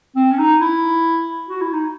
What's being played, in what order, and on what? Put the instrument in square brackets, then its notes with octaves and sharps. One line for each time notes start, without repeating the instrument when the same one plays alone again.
[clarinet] C4
C#4
D#4
E4
F#4
E4
D#4